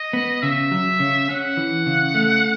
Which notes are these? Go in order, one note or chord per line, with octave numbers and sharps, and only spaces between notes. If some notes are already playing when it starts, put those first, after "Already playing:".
Already playing: D#5
B3
C#3 E5
F#3
C#3
C#4 F#5
E3
C#3
A3